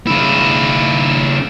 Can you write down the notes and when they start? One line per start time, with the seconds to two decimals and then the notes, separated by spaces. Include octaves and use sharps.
0.07 C#3 E4